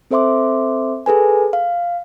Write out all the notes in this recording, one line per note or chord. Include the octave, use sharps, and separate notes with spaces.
C4 A4 C5 E5 C6 D6
G#4 A4 B4 G#5
F5